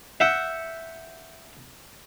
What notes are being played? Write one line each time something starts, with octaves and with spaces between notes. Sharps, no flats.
E5 F#5 G5